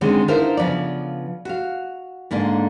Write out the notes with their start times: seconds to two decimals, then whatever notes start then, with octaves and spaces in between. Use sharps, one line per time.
0.01 D3 D#3 G#3 C4 C#4
0.28 D3 D#4 E4 A#4 C5 F5
0.57 C#3 F3 B3 D5
1.45 F#4 F5
2.31 G#2 D3 A#3 D5